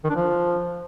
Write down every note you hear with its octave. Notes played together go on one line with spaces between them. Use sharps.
D#3
D4
F3